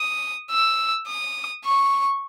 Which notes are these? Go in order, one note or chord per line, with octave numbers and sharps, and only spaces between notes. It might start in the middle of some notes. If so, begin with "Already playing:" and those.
Already playing: D#6
E6
D#6
C#6